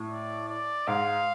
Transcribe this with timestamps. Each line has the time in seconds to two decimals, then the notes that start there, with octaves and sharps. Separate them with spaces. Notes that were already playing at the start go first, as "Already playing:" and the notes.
Already playing: A2
0.09 D5
0.49 D5
0.87 G#2 F5